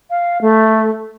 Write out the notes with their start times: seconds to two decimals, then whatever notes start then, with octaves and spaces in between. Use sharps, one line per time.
0.10 F5
0.41 A3